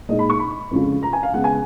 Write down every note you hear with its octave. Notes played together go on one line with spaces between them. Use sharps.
A#2 G#3 D#4 D#5
B5
C#6
B5
F2 C#3 G#3 C#4 F4
A#5
G#5
F5
C#3 G#3 B3 F#5
G#5